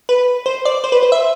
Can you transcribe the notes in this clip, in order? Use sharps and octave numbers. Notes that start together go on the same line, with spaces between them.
B4
C5
D5
C5
B4
C5
E5